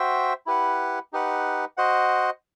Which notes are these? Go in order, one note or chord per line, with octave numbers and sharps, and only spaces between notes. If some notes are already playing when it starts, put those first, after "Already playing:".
Already playing: F#4 C5 E5 G5
E4 G4 B4 F#5
D#4 G4 B4 F#5
F#4 C5 D#5 F#5